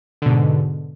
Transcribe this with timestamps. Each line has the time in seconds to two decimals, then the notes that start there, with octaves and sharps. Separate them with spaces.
0.22 D3
0.26 B2
0.30 G#2